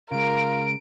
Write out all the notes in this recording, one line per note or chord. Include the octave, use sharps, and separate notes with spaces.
C#3 G#3 F4 A#4 D7